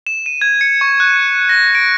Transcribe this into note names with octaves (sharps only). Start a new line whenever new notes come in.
E7
D#7
G#6
C#7
C#6
F#6
A#6
D7